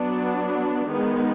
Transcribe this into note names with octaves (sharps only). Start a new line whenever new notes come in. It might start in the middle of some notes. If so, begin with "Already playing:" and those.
Already playing: F#3 B3 D4
D#3 G#3 B3